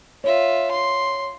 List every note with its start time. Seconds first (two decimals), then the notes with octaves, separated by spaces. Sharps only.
0.24 F4 C#5 E5
0.71 C6